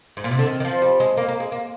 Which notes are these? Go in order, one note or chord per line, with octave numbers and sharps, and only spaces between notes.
G#2
A#2
C3
D3
D#3
D#3
F3
G3
G#3
A#3
A#3
G#3
A#3